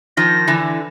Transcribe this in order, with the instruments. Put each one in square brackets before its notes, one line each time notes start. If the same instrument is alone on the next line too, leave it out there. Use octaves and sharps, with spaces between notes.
[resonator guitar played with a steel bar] D#3 F3 [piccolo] A#6
[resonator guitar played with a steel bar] D3 E3